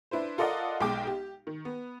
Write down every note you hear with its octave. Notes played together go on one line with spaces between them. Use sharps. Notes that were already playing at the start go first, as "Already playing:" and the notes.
D4 E4 B4 C5
F4 A4 A#4 D5 D#5 F#5
B1 G#3 G5 D6
G4
D#3
B3